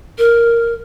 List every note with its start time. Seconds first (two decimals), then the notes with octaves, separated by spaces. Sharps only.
0.18 A#4